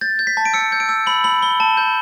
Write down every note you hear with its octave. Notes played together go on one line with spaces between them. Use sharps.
G6 A6
G6
B6
A5
D7
E6 C#7
G6
D7
E6
B5 F#7
B5 F#7
B5 G7
A5
G6